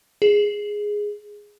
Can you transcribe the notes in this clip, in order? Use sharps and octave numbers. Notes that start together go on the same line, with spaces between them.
G#4